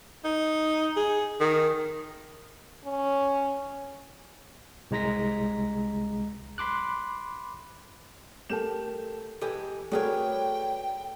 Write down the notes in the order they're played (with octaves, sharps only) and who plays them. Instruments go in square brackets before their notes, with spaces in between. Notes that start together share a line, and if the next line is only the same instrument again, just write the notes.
[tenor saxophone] D#4
G#4
D#3
[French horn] C#4
[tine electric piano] C2 G#3 A#5 A#6 B6
B5 C6 D6 F#6
[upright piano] A3 E7 [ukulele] G4 A#4 A5
[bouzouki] E3 G#3 [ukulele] G4 A4
[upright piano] A3 [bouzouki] D4 B4 C#5 [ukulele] F#4 G#4 A#4 [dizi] G5